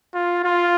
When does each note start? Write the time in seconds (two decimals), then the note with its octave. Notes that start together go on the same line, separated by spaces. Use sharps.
0.14 F4
0.44 F4